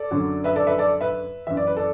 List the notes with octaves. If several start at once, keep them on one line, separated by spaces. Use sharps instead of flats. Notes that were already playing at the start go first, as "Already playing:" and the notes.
Already playing: A4 D5
F#2 D3 F#3
B4 E5
A4 D5
B4 E5
A4 D5
B4 E5
F#2 E3 E5
D5
B4
A4 D5